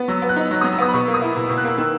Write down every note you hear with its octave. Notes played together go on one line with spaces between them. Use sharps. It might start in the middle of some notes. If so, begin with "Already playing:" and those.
Already playing: B3
F#3 E6
B3
F#6
D#4
F#3
D#6
F#3
E6
B3 D#6
B5
B2 C#6
A#3
D#6
E4
B2 E6
E6
B2
F#6
A#3 E6
D#3 E6